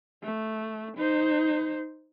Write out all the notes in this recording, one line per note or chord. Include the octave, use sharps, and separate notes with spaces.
A3
D#4 C5